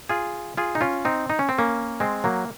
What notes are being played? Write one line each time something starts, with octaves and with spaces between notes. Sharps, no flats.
F4 G#4
F4 G#4
D#4
C#4 F4
C4 D#4
D#4
C#4
C4
A#3 C#4
G#3 C4
F#3 A#3